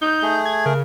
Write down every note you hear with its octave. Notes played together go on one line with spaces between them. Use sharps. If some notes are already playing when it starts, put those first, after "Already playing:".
D#4 G6
A3 G#4
G#6
C#3 A#4